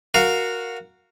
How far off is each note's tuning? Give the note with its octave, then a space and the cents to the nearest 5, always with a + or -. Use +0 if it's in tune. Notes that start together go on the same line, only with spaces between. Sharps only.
F#4 -10 A#4 +0 F5 +0